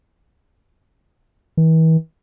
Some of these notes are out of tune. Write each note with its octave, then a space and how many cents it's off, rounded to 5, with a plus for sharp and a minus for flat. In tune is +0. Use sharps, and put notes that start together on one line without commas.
E3 -40